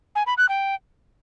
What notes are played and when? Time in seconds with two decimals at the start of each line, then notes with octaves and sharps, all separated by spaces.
0.15 G#5
0.26 B5
0.38 F#6
0.49 G5